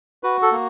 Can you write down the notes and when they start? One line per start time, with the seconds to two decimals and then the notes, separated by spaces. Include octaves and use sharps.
0.23 F#4 B4
0.42 A4
0.52 A#3